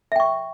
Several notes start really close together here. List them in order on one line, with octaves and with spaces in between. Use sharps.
E5 G5 C#6